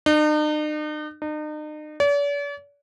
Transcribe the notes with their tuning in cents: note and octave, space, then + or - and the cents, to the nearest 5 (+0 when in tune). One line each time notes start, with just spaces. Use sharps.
D#4 -45
D#4 -40
D5 -45